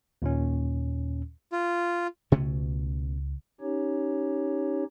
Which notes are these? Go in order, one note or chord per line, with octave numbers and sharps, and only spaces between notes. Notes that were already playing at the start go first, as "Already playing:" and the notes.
D#2 A#2 C#4
F4
C#2 B2 A3 C#4
C#4 D#4 G4 C#5